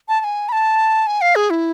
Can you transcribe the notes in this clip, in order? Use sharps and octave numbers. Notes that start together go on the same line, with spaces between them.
A5
A5
G#5
B5
A5
G#5
F5
G#4
E4